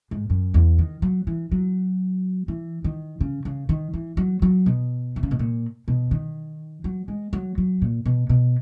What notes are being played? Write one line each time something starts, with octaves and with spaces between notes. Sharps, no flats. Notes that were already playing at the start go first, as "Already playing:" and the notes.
G#2
F#2
E2
D#3
F#3
E3
F#3
E3
D#3
C#3
C#3
D#3
E3
F#3
F#3
B2
D#3
C#3
B2
A#2
B2
D#3
F#3
G#3
F#3
F#3
A#2
B2
B2